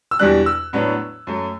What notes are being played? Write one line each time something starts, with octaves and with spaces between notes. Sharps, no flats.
E6
E2 B2 G3 D4 F#6
E6
A2 F#3 B3 D4
F#2 F#3 A3